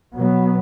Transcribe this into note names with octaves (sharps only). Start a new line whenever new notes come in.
B2 F#3 B3